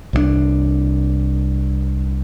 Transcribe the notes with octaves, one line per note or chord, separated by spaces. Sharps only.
C2 F3 D4